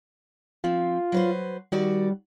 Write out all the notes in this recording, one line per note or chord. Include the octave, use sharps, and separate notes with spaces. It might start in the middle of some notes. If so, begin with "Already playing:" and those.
F3 C4 F4
F#3 B4 C5
D#3 G3 F#4 D5